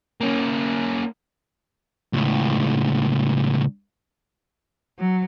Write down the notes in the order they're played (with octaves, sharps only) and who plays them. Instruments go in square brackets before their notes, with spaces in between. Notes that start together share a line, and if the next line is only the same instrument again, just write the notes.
[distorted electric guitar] A#3 C#4
[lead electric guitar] C#2 A2
[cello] F#3